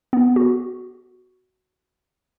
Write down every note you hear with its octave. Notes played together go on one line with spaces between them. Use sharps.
B3
F#4